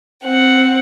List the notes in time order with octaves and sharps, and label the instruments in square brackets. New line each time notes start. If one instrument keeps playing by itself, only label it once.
[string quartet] C4 F#5